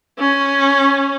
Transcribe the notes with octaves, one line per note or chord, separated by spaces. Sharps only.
C#4